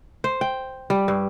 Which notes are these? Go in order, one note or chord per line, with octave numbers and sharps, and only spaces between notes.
C5
G5
G3
G2